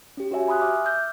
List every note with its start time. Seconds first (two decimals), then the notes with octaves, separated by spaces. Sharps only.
0.17 C#4 G4
0.31 F#4 G4 C#5 E5 G#5
0.47 G#5 B5 C6 D#6 F#6
0.61 E5 D6 F6
0.83 D6 E6 F6 G6